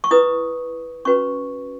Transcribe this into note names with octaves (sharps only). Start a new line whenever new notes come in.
C#6
E4 B4 D#6
C#4 F#4 B4 C#6